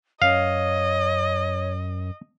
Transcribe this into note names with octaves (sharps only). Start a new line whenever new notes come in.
F#2 C#5 D#5 F5